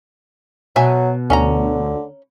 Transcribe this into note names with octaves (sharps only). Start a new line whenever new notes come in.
B2 F#3 E5 G#5
D2 D3 C#4 E5 A#5